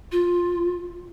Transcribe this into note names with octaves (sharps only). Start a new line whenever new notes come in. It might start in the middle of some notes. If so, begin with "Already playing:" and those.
F4